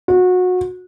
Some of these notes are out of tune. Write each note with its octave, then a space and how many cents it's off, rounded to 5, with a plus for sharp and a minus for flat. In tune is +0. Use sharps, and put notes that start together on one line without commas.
F#4 -25